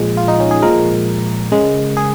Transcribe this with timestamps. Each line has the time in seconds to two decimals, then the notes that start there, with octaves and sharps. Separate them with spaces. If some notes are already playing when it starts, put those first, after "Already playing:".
Already playing: A#2 F3 G#3 G#4
0.17 F4
0.28 D#4
0.40 C#4
0.51 G#4
0.63 A#2 F3 G#3 A#4
1.52 C#3 G#3
1.97 G#4